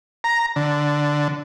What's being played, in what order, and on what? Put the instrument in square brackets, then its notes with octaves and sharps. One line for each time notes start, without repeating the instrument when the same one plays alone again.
[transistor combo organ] A#5
D3